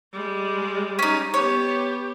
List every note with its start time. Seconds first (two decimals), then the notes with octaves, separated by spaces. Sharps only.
0.13 G3 G#3
0.99 C#4 D#4
1.34 B3 G4 C#5